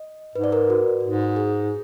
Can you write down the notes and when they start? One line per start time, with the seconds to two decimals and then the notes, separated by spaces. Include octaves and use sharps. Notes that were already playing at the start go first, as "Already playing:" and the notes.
Already playing: D#5
0.35 G#2 B4
0.44 D5
0.52 A#4
0.61 B4
0.70 F#4
1.03 G#2
1.36 G#4